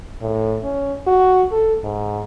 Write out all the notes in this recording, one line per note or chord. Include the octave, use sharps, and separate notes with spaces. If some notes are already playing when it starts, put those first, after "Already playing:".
A2
C#4
F#4
A4
G#2